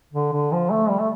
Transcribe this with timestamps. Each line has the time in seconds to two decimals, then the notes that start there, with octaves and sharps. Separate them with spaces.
0.13 D3
0.33 D3
0.52 F3
0.70 A3
0.89 G3
0.99 A3